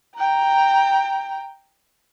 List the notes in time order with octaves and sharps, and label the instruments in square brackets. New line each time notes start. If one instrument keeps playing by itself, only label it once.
[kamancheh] G5 A#5